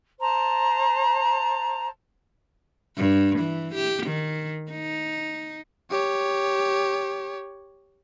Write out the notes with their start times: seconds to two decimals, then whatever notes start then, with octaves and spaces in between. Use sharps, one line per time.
0.20 C5 A5 A#5
2.97 G2
3.39 E3
3.74 G4
4.07 D#3
4.72 D#4
5.91 G4 C#5